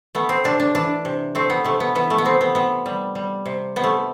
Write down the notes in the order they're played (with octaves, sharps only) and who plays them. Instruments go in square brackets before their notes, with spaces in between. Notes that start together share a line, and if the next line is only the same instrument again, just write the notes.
[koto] A3 B3
C4
C3 D4
D4
E3 D4
C3
A3 C4
B3
C3 A3
B3
E3 B3
A3
B3
C3 C4
B3
C3 B3
G3
G3
C3
C3 B3
A3